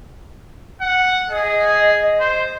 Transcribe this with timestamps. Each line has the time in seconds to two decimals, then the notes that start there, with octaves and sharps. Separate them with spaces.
0.81 F#5
1.30 G#4 D#5
2.20 C5